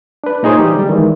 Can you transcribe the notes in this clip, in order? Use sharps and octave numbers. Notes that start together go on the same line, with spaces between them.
D4 B4
A#2 D#4 G#4 C5 C#5
E3 G3 D#4 G4
D3 G3
D#3 E3 G#3